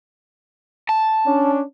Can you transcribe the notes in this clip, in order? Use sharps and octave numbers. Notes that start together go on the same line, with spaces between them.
A5
C#4 D4